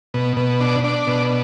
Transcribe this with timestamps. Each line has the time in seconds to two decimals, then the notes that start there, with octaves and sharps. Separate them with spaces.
0.14 B2
0.37 B2
0.60 D4
0.84 D4
1.07 B2